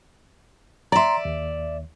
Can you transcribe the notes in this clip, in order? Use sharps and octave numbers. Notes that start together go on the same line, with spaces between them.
D5 E5 A#5 C6
D#2